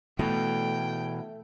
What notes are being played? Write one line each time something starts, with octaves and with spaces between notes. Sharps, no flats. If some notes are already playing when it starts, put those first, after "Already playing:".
B2 E3 A3 G5